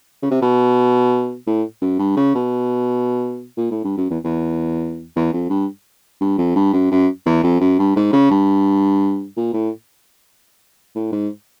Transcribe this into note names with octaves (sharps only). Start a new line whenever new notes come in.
C#3
C3
B2
A2
F#2
G2
C#3
B2
A#2
A2
G2
F#2
E2
E2
E2
F2
G2
G2
F2
G2
F#2
F#2
E2
F2
F#2
G2
G#2
C#3
G2
A#2
A2
A2
G#2